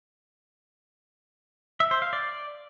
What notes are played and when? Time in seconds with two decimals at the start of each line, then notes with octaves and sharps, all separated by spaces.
1.80 E5
1.91 C5
2.02 F5
2.13 D5